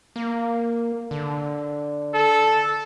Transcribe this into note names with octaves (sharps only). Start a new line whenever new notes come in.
A#3
D3
A4